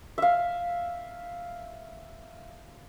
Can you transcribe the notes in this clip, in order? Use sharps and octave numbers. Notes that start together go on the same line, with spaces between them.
E5 F5